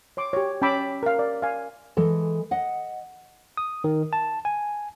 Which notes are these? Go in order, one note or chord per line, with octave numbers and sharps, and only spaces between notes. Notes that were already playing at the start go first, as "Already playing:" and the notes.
C#5 C6 D6
G4 C#5
C#4 G5 A5 B5 D6 E6
A#4 F5
D5
F5 G#5
E3 G#3 A4
D#5 F#5
D#6
D#3
A5
G#5